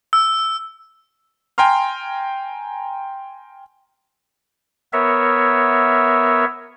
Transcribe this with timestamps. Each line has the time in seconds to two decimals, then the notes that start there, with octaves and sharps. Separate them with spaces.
0.13 E6
1.58 G5 G#5 A#5 C6 F6
4.93 B3 A#4 C#5 E5